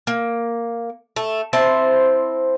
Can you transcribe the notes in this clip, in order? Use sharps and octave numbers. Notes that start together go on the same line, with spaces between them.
A#3
A3
C4 E4 C5 A5